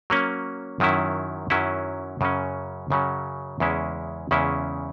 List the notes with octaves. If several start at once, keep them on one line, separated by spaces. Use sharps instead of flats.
F#3 A#3 C#4
F#2 D#3 F#3 C#4 E4
F#2 D#3 F#3 C#4 E4
F#2 C#3 F#3 C#4
F#2 C#3 F#3 C#4
E2 C#3 G#3 C#4 E4
E2 C#3 G#3 C#4 E4